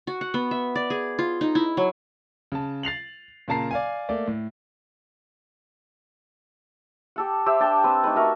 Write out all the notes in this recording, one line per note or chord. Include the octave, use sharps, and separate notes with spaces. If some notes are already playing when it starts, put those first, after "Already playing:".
F#4
F#5
B3
E5
D5
G#4
F4
D#4
E4
F#3
C#3 A5
A6 C7 F7 F#7
A#2 C#3 A#3 A5 A#5 C7
D5 F5 G#5
A3 A#3 D5
A2
G4 A4 F#5
G4 C5 E5
D4 G5 A5
C4 B4
A3 D#4 B4
F#4 A#4 E5